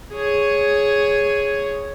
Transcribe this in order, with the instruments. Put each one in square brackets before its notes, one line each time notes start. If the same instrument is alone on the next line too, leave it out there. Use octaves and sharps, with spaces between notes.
[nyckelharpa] G#4 C#5